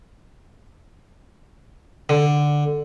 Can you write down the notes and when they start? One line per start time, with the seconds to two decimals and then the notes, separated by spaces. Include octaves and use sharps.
2.09 D3